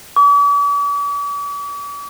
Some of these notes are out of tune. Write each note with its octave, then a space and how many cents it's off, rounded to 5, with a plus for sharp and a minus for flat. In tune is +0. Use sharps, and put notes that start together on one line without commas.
D6 -45